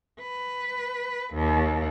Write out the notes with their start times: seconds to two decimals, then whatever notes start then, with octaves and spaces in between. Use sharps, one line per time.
0.19 B4
1.34 D#2